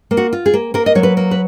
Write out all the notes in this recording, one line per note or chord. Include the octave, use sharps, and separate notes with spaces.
A#3
F#4
F4
G#4
A#3
A#3 A#4
D#5
F#3 C#5
B4
A#3
B4